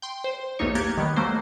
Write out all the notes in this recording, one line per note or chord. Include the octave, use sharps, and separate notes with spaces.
G5 C6
C5
B1 E2 A3 A#3 D#4 C#5
A#3 G4 F#6 G#6 A6
D#3 G3 B3
F#3 A3 A#3 C5